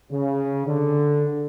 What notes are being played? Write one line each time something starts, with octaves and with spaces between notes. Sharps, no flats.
C#3
D3